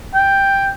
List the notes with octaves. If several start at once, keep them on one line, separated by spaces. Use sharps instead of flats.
G5